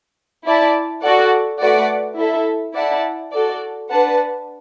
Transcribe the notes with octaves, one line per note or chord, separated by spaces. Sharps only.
E4 D5 A5
F#4 A4 D5 F#5
A3 F#4 B4 D5 F#5
E4 A4 E5
E4 D5 F#5 A5
F#4 A4 D5
D4 B4 F#5 A5